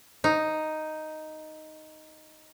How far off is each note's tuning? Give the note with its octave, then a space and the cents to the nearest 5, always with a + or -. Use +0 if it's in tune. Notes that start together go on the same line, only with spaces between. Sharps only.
D#4 +0